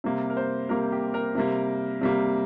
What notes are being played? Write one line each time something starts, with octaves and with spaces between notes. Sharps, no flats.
C3 G3 A#3
A#4
C5
C3 G3 A#3 A#4
G4
A#4
C3 G3 A#3
C3 G3 A#3